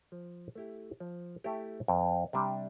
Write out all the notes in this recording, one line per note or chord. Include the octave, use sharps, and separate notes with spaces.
F3
A3 E4 G4
F3
A3 E4 G4
F2
C3 G3 D4